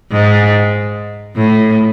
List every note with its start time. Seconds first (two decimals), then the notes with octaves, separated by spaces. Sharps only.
0.11 G#2
1.36 A2